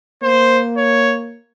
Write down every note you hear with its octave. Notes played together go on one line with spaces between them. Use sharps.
A#3 C5
C#5